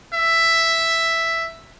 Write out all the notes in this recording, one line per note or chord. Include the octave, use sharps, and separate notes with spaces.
E5